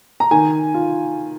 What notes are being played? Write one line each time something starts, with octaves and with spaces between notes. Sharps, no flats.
A#5
D#3 G#5
F4